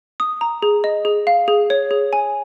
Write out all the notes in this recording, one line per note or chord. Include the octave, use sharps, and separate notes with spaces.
D#6
A#5
G#4
D#5
G#4
F5
G#4
C#5
G#4
G#5